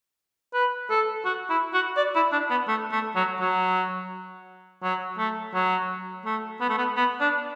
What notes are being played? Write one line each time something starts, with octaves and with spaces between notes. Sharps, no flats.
B4
A4
F#4
E4
F#4
D5
E4
D4
B3
A3
A3
F#3
F#3
F#3
A3
F#3
A3
B3
A3
B3
B3
D4